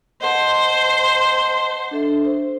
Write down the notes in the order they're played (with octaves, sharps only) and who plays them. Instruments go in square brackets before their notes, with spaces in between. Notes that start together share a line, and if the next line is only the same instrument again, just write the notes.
[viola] C5 [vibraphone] D#5 F#5 A5
[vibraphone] D4 A4 E5
C5